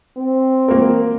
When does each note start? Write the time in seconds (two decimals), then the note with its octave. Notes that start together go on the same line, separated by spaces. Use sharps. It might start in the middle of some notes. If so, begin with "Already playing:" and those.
0.17 C4
0.68 A#3 F#4 A#4